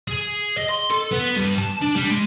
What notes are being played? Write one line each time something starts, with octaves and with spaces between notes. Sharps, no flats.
G#4
D#5
C6
A4
B3
G2
A5
D4
G3
G#3